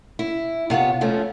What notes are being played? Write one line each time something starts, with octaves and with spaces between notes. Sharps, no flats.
E4
C3 B3 F4 C#5
F2 F3 A3 C#4